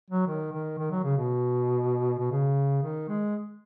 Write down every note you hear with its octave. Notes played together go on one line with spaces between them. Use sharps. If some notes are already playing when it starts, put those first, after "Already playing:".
F#3
D#3
D#3
D#3
F#3
C#3
B2
B2
C#3
D#3
G#3